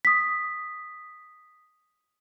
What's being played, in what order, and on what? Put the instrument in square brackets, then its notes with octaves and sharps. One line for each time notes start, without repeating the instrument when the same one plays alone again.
[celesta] D#6 B6